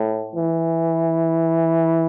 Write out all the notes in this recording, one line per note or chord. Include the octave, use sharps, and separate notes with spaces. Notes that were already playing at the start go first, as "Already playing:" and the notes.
Already playing: A2
E3